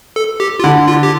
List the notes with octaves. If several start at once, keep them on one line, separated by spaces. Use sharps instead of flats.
A4
G4
F4
D3 E4
F4
G4